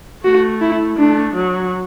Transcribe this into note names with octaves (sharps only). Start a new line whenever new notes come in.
A3 F#4
E4
A3 D4
F#3